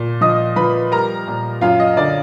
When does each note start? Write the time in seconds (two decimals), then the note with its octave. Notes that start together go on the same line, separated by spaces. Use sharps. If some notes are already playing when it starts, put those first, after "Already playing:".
Already playing: A#2
0.21 F3 D#5 D#6
0.56 F3 B4 B5
0.91 G3 A#4 A#5
1.28 A#2
1.61 F#2 F4 F5
1.80 D#5
1.97 D3 D5